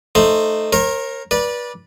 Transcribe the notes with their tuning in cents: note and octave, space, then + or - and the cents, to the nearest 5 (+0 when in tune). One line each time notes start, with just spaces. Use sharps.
A3 +0 D#4 -15 C5 +0
A#4 +0 C#5 -45
B4 -30 D5 +0